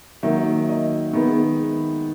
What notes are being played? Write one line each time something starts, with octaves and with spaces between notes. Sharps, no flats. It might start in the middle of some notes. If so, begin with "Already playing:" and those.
D#3 F#3 A#3 E5
D#5
D#3 G#3 B3